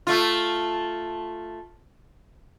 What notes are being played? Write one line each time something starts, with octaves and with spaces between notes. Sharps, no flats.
A3 F4